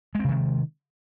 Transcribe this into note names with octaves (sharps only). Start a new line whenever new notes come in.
C3 D#3 G#3 C4